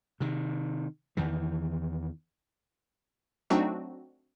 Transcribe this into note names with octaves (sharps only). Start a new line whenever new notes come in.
C3 D#3
E2 D#3 E3
F#3 A3 C4 D4 D#4 F#4